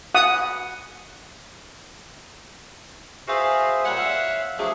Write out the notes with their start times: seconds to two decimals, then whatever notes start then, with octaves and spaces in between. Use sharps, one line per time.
0.15 F#5 D#6
3.28 F#4 G#4 B4 C5 E5 F5
3.85 A#2 G3 C5 C#5 F#5
3.98 E5 F5
4.58 F3 F#3 A3 C4 D4 G#4